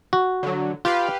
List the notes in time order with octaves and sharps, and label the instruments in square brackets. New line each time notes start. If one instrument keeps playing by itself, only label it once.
[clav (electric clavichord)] F#4
[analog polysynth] D3 F#3
[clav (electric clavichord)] F4 [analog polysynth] G4 B4 F5